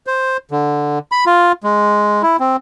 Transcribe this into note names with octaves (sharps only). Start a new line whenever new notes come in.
C5
D3
B5
F4
G#3
E4
C4